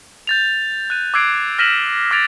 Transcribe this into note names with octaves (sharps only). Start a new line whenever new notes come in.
G6 A6 F7
F#6 D#7
D6 E6 F#6 G#6 C7 D7
F6 A#6 B6 D#7 E7 F#7
D6 F6 G#6 A6 D7 F7